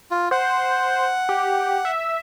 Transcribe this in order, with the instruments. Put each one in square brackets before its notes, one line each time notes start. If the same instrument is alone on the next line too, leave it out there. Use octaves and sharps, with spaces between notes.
[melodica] F4
[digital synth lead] C5 [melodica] F#5
[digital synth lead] G4
E5